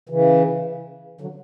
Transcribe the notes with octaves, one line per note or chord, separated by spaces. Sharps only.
C#3 E3
D3 F#3